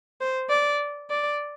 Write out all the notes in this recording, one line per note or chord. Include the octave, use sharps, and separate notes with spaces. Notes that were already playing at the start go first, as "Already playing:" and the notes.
C5
D5
D5